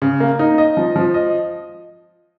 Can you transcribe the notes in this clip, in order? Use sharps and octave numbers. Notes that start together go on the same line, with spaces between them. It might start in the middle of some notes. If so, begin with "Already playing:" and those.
C#3
A#3
D#4
D#5
F3
F3
D#5